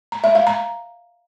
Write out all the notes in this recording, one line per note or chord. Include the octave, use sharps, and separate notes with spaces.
A#5
E5
F5
A#5